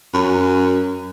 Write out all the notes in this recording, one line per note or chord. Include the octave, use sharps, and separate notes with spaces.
F#2